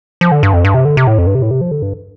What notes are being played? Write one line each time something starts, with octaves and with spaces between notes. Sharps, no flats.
F3
D3
G2
F2
G2
C3
D3
C3
A2
F2
G2
C3
A2
C3
F3
D3
G2